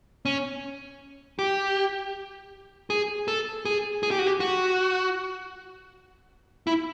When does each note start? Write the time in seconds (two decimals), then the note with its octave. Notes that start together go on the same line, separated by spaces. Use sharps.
0.25 C#4
1.39 G4
2.90 G#4
3.28 A4
3.65 G#4
4.03 G#4
4.11 G4
4.19 F#4
4.27 G4
4.40 F#4
6.67 E4